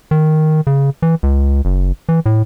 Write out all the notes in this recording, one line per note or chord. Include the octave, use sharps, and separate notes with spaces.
D#3
C#3
E3
C#2
F#1
E3
A2